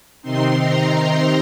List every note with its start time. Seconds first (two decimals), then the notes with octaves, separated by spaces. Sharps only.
0.22 C3 D#3 C4 D#4 C6
0.59 A#5
0.94 A#5